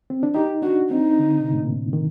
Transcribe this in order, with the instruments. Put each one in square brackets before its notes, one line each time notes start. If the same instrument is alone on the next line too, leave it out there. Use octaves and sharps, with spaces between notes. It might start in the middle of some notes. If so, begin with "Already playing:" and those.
[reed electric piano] C4
D4
[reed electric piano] D#4 [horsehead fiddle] G4
[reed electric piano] D4 [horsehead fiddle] F#4
[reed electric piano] C4 [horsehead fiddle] D#4
[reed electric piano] D3
C3
A2
A#2
D#3